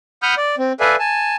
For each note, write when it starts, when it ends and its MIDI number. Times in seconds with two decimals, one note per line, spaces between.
0.23 0.35 78
0.23 0.35 83
0.23 0.35 87
0.23 0.35 89
0.23 0.35 91
0.37 0.55 74
0.58 0.73 60
0.80 0.96 69
0.80 0.96 71
0.80 0.96 74
0.80 0.96 76
0.80 0.96 77
0.80 0.96 80
0.99 1.36 80
0.99 1.36 81